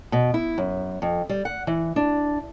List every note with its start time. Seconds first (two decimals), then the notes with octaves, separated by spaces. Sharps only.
0.12 B2
0.34 E4
0.58 F#2
1.02 F2
1.29 G3
1.45 F#5
1.67 E3
1.96 D4